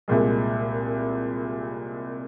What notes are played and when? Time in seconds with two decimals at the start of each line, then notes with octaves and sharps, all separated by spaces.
0.08 C2 A#2 G#3